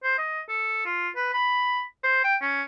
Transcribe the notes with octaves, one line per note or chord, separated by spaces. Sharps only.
C5
D#5
A4
F4
B4
B5
C5
G5
C#4